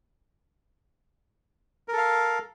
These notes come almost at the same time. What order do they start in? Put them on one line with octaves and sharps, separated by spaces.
A#4 A4 F5